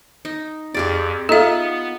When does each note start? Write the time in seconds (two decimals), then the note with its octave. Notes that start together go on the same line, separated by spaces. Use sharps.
0.25 D#4
0.74 F2 G4 G#4 D5
1.29 B3 D#4 F4 A4 E5